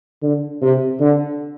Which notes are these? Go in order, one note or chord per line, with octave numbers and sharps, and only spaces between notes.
D3
C3
D3